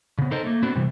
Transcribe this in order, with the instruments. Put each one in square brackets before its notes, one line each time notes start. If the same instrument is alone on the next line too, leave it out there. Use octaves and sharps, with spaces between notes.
[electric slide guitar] C#3 B3
D#4 A4 A#4 C5 D#5
A3 A#3
B3 C4 D4 F#4
C3 E3 G3